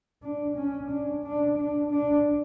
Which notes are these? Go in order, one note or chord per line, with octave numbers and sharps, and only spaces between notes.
D4
C#4
D4
D4
D4
D4